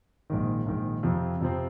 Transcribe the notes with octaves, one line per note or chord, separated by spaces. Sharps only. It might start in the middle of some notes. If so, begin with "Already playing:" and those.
A#1 G#2 D#3
A#1 G#2 D#3
F2 C3 F3 C4
F2 C3 F3 C4